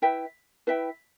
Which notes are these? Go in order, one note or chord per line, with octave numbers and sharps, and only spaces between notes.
E4 B4 E5 G5
E4 B4 E5 G5